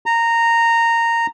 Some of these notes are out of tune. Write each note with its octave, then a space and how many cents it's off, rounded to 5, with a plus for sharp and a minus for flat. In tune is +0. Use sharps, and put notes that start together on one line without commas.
A#5 -15